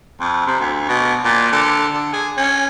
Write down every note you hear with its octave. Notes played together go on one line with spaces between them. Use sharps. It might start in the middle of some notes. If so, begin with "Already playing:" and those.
F2
C3
D2
B2
A#2
D3
D3
G#4
C#4